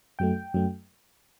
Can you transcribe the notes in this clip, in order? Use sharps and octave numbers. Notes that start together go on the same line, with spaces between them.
F#2 F#3 A3 G5
F#2 F#3 A3